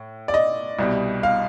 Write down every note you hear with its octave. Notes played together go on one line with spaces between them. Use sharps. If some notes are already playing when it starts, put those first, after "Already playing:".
Already playing: A2
D5
D#5
C2 B2 G3
F5